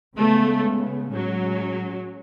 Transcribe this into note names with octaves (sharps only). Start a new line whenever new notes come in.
C#3 G#3 A3 B3
A2 F#3 G#3 C#4